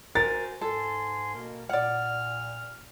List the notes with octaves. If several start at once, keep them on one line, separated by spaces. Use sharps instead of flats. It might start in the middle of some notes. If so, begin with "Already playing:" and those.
F#4 A#4 C5 G#5 A6
G#2 A4 G#5 C6
B2 A#3 A#4
A#2 D5 F#5 F6